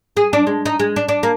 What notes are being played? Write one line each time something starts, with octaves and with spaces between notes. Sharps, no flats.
G#4
D4
G#3
D#4
G#3
D4
D4
A#3